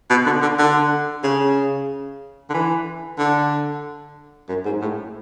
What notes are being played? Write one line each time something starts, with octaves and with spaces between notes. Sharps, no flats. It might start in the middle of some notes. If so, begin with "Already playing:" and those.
B2
D3
D3
D3
C#3
D3
E3
D3
F#2
G#2
A2